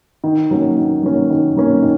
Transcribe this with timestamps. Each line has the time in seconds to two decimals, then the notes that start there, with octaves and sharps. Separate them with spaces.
0.24 D#3
0.51 F#3 A#3 C#4
0.77 D#3
1.03 F#3 A#3 C#4
1.30 D#3
1.56 F#3 A#3 C#4
1.82 D#3